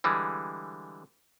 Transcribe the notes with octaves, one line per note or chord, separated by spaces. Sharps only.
D3 E3 G3 G#3